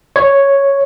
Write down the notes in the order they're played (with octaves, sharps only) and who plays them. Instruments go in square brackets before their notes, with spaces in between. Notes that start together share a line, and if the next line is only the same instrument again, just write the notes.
[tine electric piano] C#5